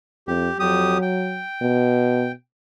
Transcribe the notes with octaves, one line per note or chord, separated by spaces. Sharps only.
F2 G4
F2 F#3 G4 D#6
G5
B2